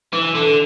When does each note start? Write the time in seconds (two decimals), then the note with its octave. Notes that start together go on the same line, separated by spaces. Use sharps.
0.13 E3
0.35 D3